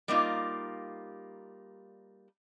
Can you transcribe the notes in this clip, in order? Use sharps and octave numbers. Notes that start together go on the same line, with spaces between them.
G3 A#3 D#4 F4